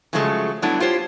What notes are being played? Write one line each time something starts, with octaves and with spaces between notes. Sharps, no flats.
C#3 F3 F#3 G#3 A3
F#3 G3 A3 B3 D4 E4
F4 G4 C5 C#5